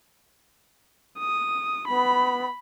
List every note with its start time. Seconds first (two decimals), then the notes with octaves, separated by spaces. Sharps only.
1.19 D#6
1.88 B3 B5